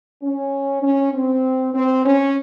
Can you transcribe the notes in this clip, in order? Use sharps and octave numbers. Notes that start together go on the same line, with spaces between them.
C#4
C#4
C4
C4
C#4